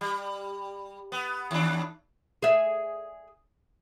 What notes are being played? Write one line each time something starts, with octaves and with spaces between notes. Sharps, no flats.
G3
B3
D#2 D4
G#4 D5 E5